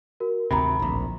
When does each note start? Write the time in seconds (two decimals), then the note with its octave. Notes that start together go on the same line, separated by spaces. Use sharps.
0.20 F#4 A#4
0.51 G#1 D2 C3 A#5 B5
0.80 D1 A#1